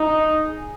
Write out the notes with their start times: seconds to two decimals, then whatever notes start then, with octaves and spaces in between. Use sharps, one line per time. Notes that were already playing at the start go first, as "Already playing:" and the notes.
Already playing: D#4
0.43 G#4